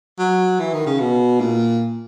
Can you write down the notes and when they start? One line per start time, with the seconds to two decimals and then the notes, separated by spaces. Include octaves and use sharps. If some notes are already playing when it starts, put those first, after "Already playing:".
0.19 F#3
0.60 E3
0.73 D#3
0.87 C#3
1.00 B2
1.41 A#2